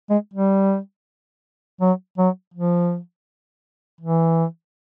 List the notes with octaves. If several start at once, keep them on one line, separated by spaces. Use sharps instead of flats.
G#3
G3
F#3
F#3
F3
E3